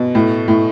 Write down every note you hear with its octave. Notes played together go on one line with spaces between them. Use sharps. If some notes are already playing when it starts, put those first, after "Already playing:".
Already playing: B2
A2
A2